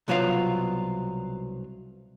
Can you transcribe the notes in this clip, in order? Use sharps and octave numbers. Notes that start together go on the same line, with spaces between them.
C2 B2 F#3 B3 F4 F5